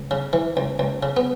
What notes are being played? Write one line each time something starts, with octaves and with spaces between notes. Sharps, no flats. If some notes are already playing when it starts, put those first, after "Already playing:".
Already playing: C#2
C#3
E3
C#2
C#2
C#3
B3